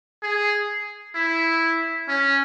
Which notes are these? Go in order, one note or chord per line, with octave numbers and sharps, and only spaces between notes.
G#4
E4
C#4